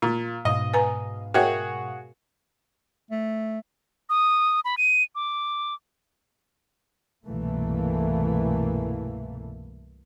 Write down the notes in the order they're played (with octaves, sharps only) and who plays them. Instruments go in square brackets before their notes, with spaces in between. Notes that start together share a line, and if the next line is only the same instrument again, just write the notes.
[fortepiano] A#2
[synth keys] G#2 B2 F5 [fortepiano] D#5
[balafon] B4 G#5 A#5
[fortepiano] F#4 G#4 C#5 [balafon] A#4 E5 G5
[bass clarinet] A3
[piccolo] D#6
B5
D#7
D6
[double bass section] C2 G2 B2 E3 A3 A#3